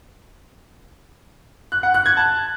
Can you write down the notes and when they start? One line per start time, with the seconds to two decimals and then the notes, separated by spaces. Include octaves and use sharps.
1.72 F#6
1.83 F#5
1.94 F#6
2.06 G#6
2.17 A5